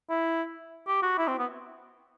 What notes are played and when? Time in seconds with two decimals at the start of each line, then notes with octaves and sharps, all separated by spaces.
0.10 E4
0.87 G4
1.02 F#4
1.18 E4
1.28 C4
1.39 B3